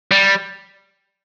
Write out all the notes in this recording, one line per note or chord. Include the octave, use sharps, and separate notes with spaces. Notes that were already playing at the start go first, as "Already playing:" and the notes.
G3